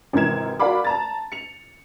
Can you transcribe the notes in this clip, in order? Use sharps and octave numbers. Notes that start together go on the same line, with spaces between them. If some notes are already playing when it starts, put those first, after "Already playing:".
G#1 C3 E3 A#4 G#6 E7
F#4 A#4 D5 F5 B5 D6
A5 A#5 A6
C#7 F7